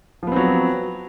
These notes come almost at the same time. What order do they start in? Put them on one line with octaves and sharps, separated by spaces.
F3 B3 C4 F#3